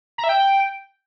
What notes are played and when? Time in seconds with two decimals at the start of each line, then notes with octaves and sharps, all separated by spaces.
0.18 A#5
0.24 E5
0.29 G5